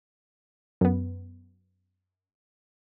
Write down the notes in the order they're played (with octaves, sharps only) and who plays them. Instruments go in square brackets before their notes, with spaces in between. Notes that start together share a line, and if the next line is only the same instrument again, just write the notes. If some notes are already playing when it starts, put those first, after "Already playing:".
[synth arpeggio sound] F#2 B3